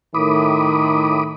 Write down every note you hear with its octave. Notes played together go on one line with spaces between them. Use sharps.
A2 D#3 B5 D6 D#6